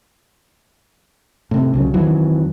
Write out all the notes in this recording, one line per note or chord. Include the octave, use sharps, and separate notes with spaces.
A2 C3
C2 C#3 F#3
F2 D#3 E3 F#3